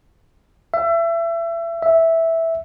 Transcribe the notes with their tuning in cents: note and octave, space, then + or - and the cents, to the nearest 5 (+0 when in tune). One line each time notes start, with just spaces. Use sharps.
E5 +30
E5 -5